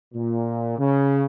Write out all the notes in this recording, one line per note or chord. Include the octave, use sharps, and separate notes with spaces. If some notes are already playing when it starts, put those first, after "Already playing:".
A#2
C#3